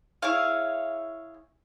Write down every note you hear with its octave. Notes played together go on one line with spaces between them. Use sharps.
E4 G#4 C#5 F5